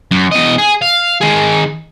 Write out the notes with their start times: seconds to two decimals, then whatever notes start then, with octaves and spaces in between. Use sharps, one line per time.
0.11 F#2
0.32 E2 D#5
0.58 G#4
0.81 F5
1.21 D#3 G#4